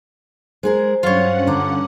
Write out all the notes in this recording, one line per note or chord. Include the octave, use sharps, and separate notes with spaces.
G#3 G#4 A#4 C5
G2 F#3 C#4 F4 C#5 F#5
D3 A#5 D6